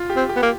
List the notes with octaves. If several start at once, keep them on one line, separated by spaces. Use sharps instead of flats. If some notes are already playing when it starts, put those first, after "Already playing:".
Already playing: F4
G4
C4
G4
B3
A#3